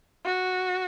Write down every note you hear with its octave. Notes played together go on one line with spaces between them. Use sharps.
F#4